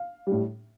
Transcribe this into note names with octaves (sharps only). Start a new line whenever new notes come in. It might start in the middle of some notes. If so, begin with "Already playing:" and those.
Already playing: F5
G3
A2